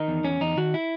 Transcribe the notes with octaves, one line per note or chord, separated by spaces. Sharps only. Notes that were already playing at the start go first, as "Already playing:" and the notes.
Already playing: D#3 D#4
E2
E2 C#4
E2 D#4
D#3 F#4
E4